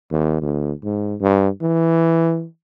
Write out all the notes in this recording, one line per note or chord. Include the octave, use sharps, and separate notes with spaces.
D#2
D2
G#2
G2
E3